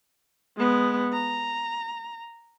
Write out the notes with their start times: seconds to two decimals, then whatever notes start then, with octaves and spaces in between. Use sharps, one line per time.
0.57 G#3 B3
1.13 A#5